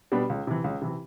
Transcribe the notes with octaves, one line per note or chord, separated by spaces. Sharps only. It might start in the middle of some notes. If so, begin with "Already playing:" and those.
B2 G3 B3 D4
C#2
C3 E3
C#2
C3 E3